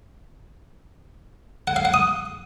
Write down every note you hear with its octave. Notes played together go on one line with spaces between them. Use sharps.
F#5
F5
F#5
D#6